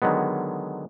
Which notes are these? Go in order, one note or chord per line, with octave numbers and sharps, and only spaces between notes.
D3 D#3 F#3 G#3 B3